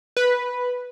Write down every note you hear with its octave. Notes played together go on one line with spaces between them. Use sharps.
B4